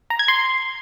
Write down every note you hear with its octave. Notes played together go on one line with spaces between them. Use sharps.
A#5
G#6
C6